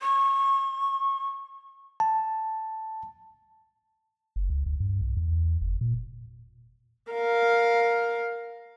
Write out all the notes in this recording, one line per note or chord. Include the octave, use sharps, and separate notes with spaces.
C#6
A5
F#1
C#2
D2
G2
B1
E2
F#1
A#2
A#4 F5